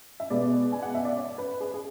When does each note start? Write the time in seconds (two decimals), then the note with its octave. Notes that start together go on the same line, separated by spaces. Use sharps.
0.20 E5
0.30 B2 G#3 B3 D5
0.72 G#5
0.83 F#5
0.95 E5
1.05 D5
1.17 C#5
1.38 B4
1.60 G#4
1.74 G#4